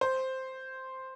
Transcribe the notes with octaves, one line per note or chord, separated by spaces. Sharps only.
C5